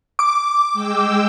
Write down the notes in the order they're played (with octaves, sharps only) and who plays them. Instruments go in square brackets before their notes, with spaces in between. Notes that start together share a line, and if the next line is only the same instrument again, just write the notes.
[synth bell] D6
[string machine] G#3 G5 E6